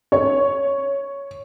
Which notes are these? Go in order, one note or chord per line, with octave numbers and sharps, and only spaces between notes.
C#5